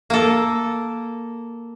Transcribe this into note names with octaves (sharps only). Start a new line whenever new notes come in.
A#3 A4